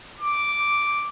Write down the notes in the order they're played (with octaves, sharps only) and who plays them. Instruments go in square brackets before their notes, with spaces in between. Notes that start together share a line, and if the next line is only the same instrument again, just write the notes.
[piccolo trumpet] D6